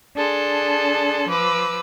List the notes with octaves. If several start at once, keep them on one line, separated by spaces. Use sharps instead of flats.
D4 G#4 A4 C6
F3 B4 D6 E6